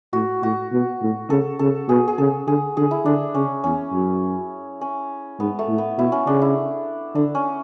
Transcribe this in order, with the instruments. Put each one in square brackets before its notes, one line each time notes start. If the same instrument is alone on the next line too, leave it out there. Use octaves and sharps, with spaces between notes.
[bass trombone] A2 [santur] F#4
[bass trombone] A2 [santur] F#4
[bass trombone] B2
A2
[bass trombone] C#3 [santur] A4
[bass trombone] C#3 [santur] A4
[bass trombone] B2 [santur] G#4
[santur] G#4
[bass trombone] C#3 [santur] A4
[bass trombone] D3 [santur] G#4
[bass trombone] D3 [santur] G#4
[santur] E4
[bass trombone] D3 [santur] D4
[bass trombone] C#3 [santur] C#4
[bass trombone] E2 [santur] C#4
[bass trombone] F#2
[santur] C#4
[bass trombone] G#2 [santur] B3
[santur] A3
[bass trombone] A2
[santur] B3
[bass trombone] B2 [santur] E4
[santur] C#4
[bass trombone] C#3 [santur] D4
[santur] E4
[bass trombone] D3 [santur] D4
[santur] C#4